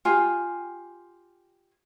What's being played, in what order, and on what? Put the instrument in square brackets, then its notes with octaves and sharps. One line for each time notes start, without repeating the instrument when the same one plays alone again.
[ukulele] F4 G4 G#5